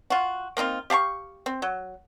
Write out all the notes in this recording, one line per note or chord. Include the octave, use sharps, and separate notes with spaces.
F4 F#4
A#3 C4 D#4 F4
G4 F5 A5 C#6
C4
F#3